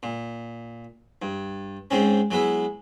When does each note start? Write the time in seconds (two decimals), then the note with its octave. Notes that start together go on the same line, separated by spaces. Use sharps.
0.03 A#2
1.22 G2
1.91 G#2 G#3 C4 C#4
2.31 F#3 G#3 B3 E4